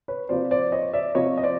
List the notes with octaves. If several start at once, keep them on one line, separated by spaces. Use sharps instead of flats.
B4 C#5
C3 F3 A#3 C5 D5
C5 D5
C#5 D#5
D5 E5
C3 F3 A#3 C#5 D#5
D#5
C5 D5